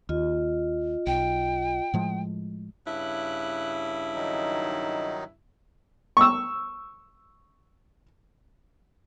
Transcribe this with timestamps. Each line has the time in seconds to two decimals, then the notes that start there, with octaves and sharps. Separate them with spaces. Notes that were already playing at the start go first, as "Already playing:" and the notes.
0.09 D#2 F4 D#5
1.07 B1 G5
1.94 A2 F3 G#3
2.86 G2 C#3 E4 F#6
4.14 D#3 F#3 D#4
6.17 C#6 E6